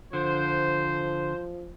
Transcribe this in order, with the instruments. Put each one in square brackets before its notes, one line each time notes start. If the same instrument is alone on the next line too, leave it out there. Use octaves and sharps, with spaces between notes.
[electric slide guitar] D3 [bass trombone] F3 [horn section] C5